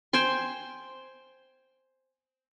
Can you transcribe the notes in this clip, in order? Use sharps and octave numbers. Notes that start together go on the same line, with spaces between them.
C5 G5 G#5 C6